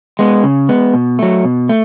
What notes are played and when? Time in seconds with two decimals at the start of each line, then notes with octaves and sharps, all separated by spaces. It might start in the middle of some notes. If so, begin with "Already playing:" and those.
0.19 G#3 B3
0.44 C#3
0.69 G#3 B3
0.94 B2
1.19 F#3 A3
1.45 B2
1.69 A3